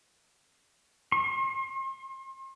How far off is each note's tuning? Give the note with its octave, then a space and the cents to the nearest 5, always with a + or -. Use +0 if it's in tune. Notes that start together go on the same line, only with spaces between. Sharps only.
C6 +40